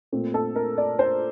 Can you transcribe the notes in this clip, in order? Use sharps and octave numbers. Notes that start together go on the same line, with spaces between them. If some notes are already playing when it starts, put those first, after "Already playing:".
A#2 A3 C4
A4
A#4
D5
C5